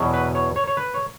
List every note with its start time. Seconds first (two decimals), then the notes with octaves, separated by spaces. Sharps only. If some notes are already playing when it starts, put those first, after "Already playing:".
Already playing: E2 B2 F#3
0.14 B4
0.35 C#5
0.56 C#5
0.67 C#5
0.77 B4
0.94 C#5